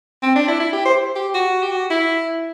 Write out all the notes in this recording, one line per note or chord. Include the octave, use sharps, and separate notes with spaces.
C4
D4
E4
E4
G4
C5
G4
F#4
G4
F#4
E4